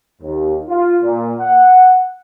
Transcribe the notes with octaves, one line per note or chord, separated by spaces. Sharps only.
D#2
F4
A#2
F#5